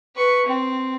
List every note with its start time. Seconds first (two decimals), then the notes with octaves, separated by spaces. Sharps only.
0.16 B4 C#6
0.45 C4